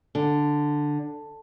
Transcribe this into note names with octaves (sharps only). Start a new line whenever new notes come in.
D3